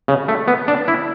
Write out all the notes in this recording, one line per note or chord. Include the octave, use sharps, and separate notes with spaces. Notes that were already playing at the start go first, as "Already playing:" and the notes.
C#3
A3
B3
D4
E4